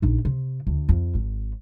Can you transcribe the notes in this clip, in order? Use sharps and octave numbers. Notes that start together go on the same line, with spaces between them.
A#1 D#4
C3
D2
F2
G#1